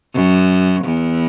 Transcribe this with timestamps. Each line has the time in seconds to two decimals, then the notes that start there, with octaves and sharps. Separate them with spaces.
0.14 F#2
0.84 E2